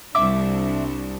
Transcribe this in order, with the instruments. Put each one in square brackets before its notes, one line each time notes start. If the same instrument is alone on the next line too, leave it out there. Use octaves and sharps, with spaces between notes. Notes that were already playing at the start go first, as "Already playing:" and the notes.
[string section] C2 D4 [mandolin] E5 D6 E6